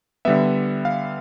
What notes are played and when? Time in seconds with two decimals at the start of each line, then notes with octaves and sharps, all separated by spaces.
0.25 D3 G3 B3 E5
0.85 F5